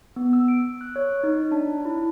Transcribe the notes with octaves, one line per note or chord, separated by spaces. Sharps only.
B3
E6
D7
F#6
C#5
D#4
D4
E4